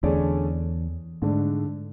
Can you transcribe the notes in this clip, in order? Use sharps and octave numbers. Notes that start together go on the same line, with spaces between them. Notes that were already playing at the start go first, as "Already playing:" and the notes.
E2 D3 A3 C#4 G#4 D5
G#2 D3 A3 D4